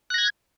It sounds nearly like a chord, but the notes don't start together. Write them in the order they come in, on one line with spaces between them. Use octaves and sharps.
F#6 A#6 G#6